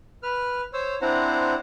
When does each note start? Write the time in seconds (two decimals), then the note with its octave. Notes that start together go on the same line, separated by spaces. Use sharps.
0.23 B4 F6
0.73 C5 C#5 E6
1.02 C4 D4 E4 C5 F#5 A#5